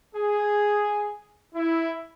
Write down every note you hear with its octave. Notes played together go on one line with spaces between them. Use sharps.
G#4
E4